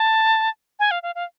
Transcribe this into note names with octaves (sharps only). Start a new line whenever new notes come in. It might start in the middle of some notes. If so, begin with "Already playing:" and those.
Already playing: A5
G#5
F5
F5
F5